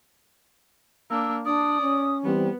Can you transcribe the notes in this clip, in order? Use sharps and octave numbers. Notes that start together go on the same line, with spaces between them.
A#3 D4 E6
D4 D5 D#6
C#4
E3 G3 B3 C4